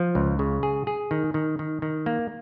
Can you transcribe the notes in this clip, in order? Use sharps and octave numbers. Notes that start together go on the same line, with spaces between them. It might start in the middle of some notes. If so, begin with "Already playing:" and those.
Already playing: F3
C#2
C#3
G#4
G#4
D#3
D#3
D#3
D#3
A#3